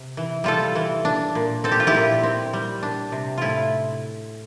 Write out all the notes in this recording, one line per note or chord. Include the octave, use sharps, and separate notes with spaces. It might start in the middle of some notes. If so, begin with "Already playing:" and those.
Already playing: C3
E3
G3 F4 A4
E3
D4
A#2
C4 A4
G4
F4
E4 G4
A#2
C4
G3
D4
C3
A2 E4 F4